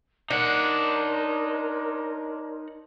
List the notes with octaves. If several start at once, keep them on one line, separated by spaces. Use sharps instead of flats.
D4 D#4 A#4 C#5 F#5 C6